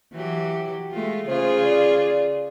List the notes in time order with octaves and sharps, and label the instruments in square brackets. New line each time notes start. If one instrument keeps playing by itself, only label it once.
[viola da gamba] E3 F#3 G4
G#3 A3 F4
[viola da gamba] C#3 F4 G#4 [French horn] C5
[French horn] D5